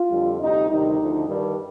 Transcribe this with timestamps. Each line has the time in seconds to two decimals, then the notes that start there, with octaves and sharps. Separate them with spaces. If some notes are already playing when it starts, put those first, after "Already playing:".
Already playing: F4
0.10 F2 D3 G3
0.40 D2 C3 G3 D#4
0.69 D2 C3 D#3 G3 D#4
0.98 D2 D3 F3
1.28 G2 D#3 G3 D4